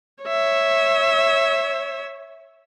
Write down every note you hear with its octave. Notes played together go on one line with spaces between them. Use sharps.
C#5 E5